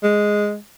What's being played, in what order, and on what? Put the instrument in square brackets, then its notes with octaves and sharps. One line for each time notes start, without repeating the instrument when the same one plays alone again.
[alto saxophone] G#3